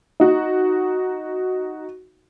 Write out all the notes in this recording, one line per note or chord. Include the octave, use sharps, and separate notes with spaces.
D#4 F#4